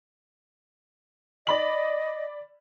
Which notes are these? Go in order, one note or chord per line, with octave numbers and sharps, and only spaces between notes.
D5 D#5 B5 F#7